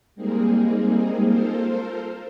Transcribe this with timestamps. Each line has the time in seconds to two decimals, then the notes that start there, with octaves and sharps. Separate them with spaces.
0.15 G3 G#3 A#3 C4 D#4 G#4
1.23 F4 A4 A#4 C5